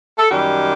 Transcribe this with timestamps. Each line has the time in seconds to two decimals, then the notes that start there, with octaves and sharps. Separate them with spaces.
0.18 A4
0.29 F#2 D#3 G3 G4